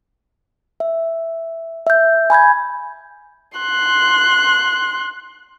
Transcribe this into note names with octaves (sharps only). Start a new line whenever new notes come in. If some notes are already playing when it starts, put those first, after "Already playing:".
E5
E5 G6
G#5 B5 G6 G#6
C6 F#6